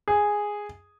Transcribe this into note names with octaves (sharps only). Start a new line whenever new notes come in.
G#4